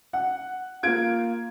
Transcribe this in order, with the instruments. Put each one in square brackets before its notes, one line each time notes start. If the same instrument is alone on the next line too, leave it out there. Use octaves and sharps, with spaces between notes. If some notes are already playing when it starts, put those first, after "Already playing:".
[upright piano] F#5
[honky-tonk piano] A#3 F4 [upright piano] G#6 D7